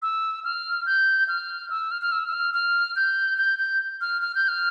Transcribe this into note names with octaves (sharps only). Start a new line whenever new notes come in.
E6
F6
G6
F6
E6
F6
F6
E6
E6
F6
F6
G6
G6
G6
F6
F6
G6
F6